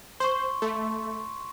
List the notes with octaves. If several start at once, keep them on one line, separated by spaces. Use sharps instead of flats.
C5 C6 C#6
A3